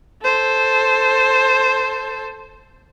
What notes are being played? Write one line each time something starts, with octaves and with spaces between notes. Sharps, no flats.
A4 C5